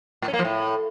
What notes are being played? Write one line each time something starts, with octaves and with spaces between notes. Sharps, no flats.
A2
C#4
A#3
F3
A2